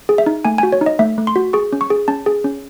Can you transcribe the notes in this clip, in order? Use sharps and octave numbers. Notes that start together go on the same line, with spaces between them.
G#4
E5
D#4
A3 G#5
F#4 G#5
C#5
D#4
D#5
A3 E5
A3
C6
F#4
G#4 C#6
C#4
C#6
G#4
C#4 A5
G#4
C#4